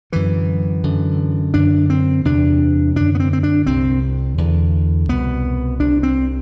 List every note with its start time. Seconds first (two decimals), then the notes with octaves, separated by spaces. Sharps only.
0.12 F#2 D3 E3
0.84 F#2 D3
1.54 F#2 D3 D4
1.90 C4
2.25 E2 C3 D4
2.96 F#2 D3 D4
3.15 B3
3.20 C4
3.33 C4
3.43 D4
3.67 C2 C3 C4
4.38 E2 D3
5.09 C2 B2 B3
5.80 C2 C3 D4
6.03 C4